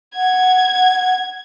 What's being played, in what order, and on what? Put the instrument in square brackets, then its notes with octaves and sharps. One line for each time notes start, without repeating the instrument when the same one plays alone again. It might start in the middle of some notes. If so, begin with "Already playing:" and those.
[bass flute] F#5 [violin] G#6